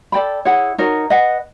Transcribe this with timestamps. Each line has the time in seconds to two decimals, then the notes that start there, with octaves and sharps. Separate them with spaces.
0.12 A4 D5 G5 B5
0.45 E4 G#4 C#5 F#5
0.78 D#4 F#4 A#4 C#5
1.10 B4 D#5 F#5